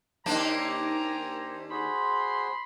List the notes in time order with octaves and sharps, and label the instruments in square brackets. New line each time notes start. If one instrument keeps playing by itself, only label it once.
[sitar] D#2 A#3 D4 [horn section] G4 G#5 A#5 [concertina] C5
[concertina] F#4 G#4 C5 [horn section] B5 C6